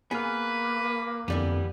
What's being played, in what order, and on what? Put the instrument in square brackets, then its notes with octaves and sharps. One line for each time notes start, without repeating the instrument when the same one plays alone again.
[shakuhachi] A#3 [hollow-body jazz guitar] B3 G#4 [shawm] B4 [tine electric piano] G#5 F6
[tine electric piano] F2 D3 [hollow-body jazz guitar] E3 G3 B3